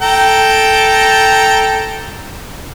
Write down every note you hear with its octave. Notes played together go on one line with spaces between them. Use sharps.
A4 G5 A#5